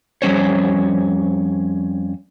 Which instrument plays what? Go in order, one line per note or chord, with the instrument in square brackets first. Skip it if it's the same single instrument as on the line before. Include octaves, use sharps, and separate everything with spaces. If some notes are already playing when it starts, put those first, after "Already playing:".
[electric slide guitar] F2 G3 C#4 C5 C#5